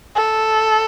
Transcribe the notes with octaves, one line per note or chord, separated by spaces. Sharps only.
A4